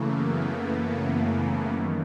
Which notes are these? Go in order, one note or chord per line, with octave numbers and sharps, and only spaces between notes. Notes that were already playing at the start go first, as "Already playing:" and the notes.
Already playing: F#2 C#3 E3 A3 A#3
B3
D#3
F#2